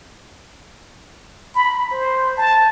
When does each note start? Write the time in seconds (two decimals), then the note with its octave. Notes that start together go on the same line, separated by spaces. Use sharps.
1.55 B5
1.92 C5
2.37 A5